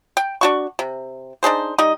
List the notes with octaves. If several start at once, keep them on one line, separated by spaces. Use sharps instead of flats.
G5
D4 F#4 C#6
C3
D4 D#4 G#4 C5
G3 D#4 D#5